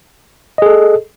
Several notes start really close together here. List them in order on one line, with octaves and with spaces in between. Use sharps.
D#5 G#4 A4